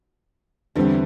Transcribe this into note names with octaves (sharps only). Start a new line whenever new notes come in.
E2 D3 E3 G3 C4